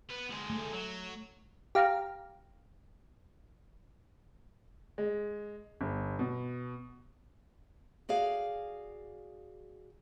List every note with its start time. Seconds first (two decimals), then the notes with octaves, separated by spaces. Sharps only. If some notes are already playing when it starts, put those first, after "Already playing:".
0.10 B3 B4
0.31 D2 G#3
0.50 A3
0.73 F#3
1.75 G4 F5 A#5
4.98 G#3
5.81 G1
6.19 B2
8.09 F#4 G#4 D5 F5